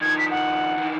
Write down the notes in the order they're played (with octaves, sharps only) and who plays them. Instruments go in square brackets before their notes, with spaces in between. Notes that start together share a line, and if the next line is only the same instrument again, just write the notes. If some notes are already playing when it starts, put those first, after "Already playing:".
[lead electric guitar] D#3 F3 [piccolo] G#6
[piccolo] B6
F#5
[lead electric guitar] D#3 E3